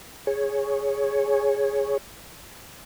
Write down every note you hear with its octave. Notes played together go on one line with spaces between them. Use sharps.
G#4 C#5